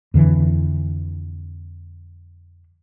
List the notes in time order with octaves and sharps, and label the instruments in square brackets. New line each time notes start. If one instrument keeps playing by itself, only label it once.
[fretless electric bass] F2 D3 E3